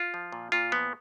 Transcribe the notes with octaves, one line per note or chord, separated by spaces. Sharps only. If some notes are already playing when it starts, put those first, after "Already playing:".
Already playing: F4
F3
A#2
A#2 F4
F3 B3